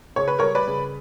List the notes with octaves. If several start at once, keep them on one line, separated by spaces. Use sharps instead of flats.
C#3 C#5
B4
G3 A#4 C#5
B4 D5
C#3